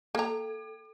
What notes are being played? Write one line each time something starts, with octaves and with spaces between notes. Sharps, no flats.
A#3 A4 A#5